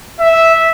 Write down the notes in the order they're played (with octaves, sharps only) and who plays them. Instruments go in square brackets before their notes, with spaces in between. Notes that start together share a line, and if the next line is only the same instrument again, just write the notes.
[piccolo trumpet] E5